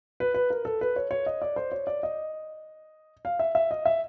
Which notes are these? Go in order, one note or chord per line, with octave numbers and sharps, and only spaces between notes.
B4
B4
A#4
A4
B4
C#5
C#5
D#5
D5
C5
C#5
D5
D#5
F5
E5
E5
D#5
E5